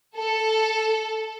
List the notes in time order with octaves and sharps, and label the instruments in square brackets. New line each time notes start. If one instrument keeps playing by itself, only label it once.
[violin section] A4